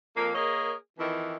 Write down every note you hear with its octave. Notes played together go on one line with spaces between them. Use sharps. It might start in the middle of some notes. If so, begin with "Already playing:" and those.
F2 A#3
A#3 G#4 A#4 C#5 D#5
F2 D#3 E3